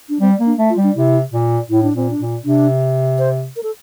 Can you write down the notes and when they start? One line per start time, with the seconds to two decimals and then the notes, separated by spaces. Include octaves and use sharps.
0.09 D4
0.21 G3 C4
0.39 A#3
0.46 D4
0.57 A3
0.70 F4
0.77 G3
0.83 D4
0.95 C3 E4
1.33 A#2
1.70 A2 E4
1.83 D4
1.94 A#2 C4
2.10 D4
2.19 A#2
2.44 C3 D4
3.19 C5
3.56 A#4
3.63 A4